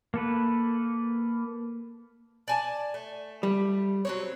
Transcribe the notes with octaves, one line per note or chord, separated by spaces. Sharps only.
A#3 A4 B4
D5 G#5 A5
A3
G3
F#3 C4 C#5